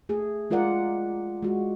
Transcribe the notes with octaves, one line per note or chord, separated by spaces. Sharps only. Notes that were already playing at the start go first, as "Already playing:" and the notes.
A3 G#4
G#3 F4 A#4 D5 F#5
G#3 F#4